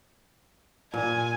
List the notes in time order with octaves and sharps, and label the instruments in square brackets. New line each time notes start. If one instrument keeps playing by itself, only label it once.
[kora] A#2 [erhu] G#5